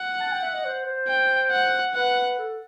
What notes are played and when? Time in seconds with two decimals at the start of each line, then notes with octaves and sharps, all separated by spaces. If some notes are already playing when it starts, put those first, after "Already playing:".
Already playing: F#5
0.21 A5
0.32 G5
0.42 E5
0.54 D#5
0.65 C5
0.86 C5
1.08 G5
1.51 F#5
1.95 B4 F#5
2.38 A4